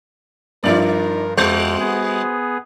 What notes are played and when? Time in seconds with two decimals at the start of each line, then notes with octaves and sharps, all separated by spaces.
0.64 G2 F3 D#4 A#4 D5
1.37 F2 G3 F#4 C5
1.80 B3 G#4